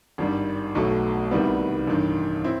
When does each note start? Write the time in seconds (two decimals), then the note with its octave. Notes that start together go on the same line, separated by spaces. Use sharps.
0.18 G#1 G2 D#3 G3
0.75 B1 B2 F#3 A3
1.31 C2 C3 D#3 G3 B3
1.87 A1 G2 D#3
2.44 C4 E4